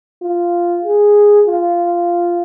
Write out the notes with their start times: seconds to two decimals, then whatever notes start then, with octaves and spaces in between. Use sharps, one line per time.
0.23 F4
0.85 G#4
1.47 F4